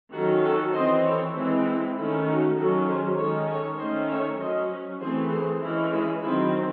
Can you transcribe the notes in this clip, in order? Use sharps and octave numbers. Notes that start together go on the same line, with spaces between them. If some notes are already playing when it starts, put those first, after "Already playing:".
D#3 F#3 C#4 F#4 A4
F#4 A4
E3 C4 C5 D#5
A4 C#5
E3 G#3 C4 E4
E4
D#3 A3 C#4 E4
D#4 F#4
D#3 F#3 C#4 F#4 A4
G#4 C5
D#3 G#3 C#4 A4 C#5
A4 C#5
D#3 A3 C#4 C5 D#5
C#5 E5
F#3 C#4 C5 D#5
E3 A3 C4 G#4 C5
G#4 C5
E3 G#3 C#4 E4
E4 G#4
D#3 F#3 C4 E4 G#4